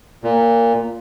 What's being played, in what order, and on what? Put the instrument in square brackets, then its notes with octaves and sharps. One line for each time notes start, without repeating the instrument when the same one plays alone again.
[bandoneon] A#2